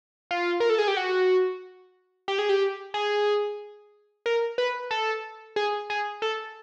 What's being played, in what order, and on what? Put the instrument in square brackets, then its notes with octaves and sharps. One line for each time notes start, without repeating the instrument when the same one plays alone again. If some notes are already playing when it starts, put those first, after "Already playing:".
[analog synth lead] F4
A#4
A4
G#4
G4
F#4
G4
G#4
G4
G#4
A#4
B4
A4
G#4
G#4
A4